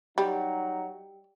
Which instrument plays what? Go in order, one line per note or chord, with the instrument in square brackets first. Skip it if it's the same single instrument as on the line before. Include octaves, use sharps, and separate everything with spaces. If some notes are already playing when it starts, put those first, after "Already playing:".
[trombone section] F#3 D#4 [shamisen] G3 [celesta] G4 G5